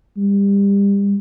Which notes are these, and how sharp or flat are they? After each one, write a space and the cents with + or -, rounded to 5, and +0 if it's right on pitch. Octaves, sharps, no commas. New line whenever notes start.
G3 +30